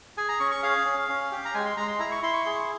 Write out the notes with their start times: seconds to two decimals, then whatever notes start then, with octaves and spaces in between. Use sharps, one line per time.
0.18 G#4 G#5
0.29 A#5
0.40 C#4 C#6
0.51 C#6
0.63 G#4 F5
0.85 C#4
1.09 C#4
1.32 G4
1.45 A#5
1.54 G#3 G#5
1.65 C6
1.77 G#3 A#5
1.88 C6
1.99 E4 A#5
2.12 C#6
2.23 E4 C6
2.34 C#6
2.45 G#4 C6
2.55 C#6